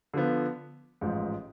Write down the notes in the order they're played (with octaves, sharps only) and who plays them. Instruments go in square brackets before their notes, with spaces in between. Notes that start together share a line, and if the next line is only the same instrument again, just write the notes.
[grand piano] D3 F3 B3
A1 G#2 F3